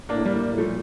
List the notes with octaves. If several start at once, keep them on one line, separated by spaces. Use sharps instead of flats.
A2 A#3 D4
A2 G3 A#3
A2
A#2 F3 A3